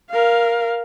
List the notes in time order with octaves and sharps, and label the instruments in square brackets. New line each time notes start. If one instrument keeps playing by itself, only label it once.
[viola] A#4 F5